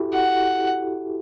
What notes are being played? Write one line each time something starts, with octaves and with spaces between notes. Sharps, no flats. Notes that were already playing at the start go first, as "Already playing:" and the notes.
Already playing: E4 F#4 G4 A4
F#5